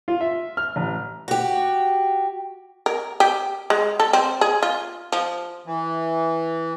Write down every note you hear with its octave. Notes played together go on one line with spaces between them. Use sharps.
F4
E5
F6
A1
F#4 G4
A#4
G4
G#3
A4
C4
G#4
F4
F3
E3